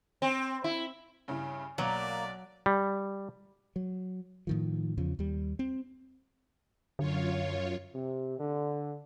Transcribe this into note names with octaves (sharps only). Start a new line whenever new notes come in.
C4
E4
G2 C#3 E4
B1 F#3 A#3 D5
G3
F#3
A2 D#3 F3
E2 C#3 F3
D#2 G3
C4
F#2 D3 F4 C#5
C3
D3